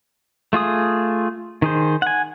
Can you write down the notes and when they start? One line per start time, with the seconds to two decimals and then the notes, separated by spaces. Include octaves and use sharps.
0.53 A3 F4 G#4 D#6
1.62 D#3 G#4 C5
2.02 F#5 G#5